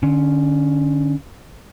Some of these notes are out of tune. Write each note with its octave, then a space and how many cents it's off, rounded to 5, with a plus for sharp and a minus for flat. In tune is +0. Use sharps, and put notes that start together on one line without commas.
D3 +30 C#4 +5